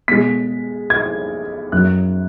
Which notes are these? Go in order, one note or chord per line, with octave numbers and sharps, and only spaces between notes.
B2 G#3 B6
G#6
F#2 F#3 F#6